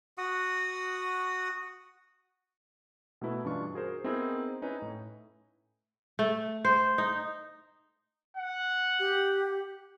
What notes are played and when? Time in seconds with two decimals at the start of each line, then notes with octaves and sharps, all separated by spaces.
0.18 F#4 F#5 D#6
3.21 B2 A3 D#4 E4 B4
3.44 G2 E3 C#4 D4 F4 C#6
3.74 F#4 G#4 A#4 C5
4.04 B3 C4 D#4 E4 G#4 A#4
4.62 C#4 D#4 E4 B4 C#5 G#5
4.82 A2
6.19 A3
6.65 C5
6.98 D#4
8.36 F#5
8.99 G4